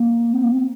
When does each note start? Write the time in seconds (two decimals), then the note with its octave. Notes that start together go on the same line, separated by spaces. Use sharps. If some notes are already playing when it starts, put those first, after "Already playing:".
Already playing: A#3
0.33 C4
0.43 A#3
0.53 C4